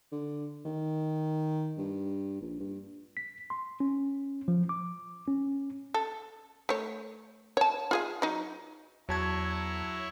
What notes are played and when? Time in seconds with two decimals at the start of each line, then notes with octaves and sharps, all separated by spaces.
0.12 D3
0.65 D#3
1.78 G2
2.41 A#1
2.60 G2
3.17 B6
3.50 C6
3.80 C#4
4.48 F3
4.69 D6
5.28 C#4
5.94 A4
6.69 A3 C#5
7.57 C#5 A5
7.91 F4 G#4 F5
8.22 F#3 D#4
9.09 E2 F#3 E4 C#5 A5 G#6